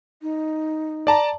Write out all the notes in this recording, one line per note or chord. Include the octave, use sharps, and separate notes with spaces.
D#4
D5 A5 A#5